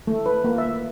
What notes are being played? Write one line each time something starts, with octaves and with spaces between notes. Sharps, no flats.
A3
B4
A#3
E5